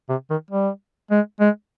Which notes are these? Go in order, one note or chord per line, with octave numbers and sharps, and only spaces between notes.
C3
D#3
G3
G#3
G#3